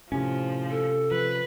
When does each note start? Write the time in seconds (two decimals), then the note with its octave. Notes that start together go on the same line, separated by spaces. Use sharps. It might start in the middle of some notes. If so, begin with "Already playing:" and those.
0.12 A2 C3 F3 C#4
0.70 A4
1.11 F3 B4